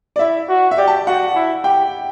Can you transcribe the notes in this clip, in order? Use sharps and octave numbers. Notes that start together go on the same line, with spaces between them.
D5
E4 E5
F#4
E5
G4 D5
A5
F#4 F#5
E4
G4 G5